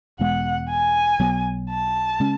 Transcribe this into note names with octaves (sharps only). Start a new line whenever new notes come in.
E1 E2 B2 G#3 F#5
G#5
B1 B2 F#3 B3
A5
C#3 G#3 C#4